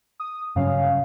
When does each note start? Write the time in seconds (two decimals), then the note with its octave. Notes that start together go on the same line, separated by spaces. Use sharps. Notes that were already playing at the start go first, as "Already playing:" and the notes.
0.20 D#6
0.56 G2 C#3 F#3 C#4 F5